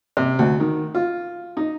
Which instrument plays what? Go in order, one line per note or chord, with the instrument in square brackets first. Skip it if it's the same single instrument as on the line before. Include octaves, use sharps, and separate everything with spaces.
[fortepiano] C3
D2
D#3
F4
D#4